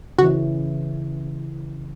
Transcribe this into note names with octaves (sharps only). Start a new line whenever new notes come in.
C#3 E3 F#4